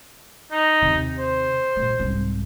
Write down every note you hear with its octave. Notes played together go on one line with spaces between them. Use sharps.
D#4
D#2 C3
C5
A#2 A3
C2 G#2